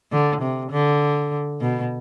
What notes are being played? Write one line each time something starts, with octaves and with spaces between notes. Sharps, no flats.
D3
C3
D3
B2